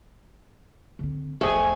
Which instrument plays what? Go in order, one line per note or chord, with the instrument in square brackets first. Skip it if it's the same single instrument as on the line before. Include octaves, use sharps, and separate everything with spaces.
[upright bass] D3 C4
[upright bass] E1 B1 [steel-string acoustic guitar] F2 [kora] A3 G#4 [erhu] G#5